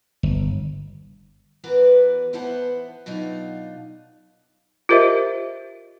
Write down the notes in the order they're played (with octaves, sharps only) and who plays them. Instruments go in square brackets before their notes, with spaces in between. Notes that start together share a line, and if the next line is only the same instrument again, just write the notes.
[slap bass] G1
[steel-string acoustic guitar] E3 B3 F#4 A#4 B4 D5
E3 B3 E4 C5 F#5 A5
B2 F#3 D4 D#4 F4
[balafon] F4 G4 A#4 C5 D#5 E5